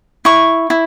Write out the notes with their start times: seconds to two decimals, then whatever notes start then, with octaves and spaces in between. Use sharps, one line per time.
0.25 E4 C#6
0.70 E4